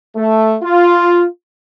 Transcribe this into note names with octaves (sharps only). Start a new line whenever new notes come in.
A3
F4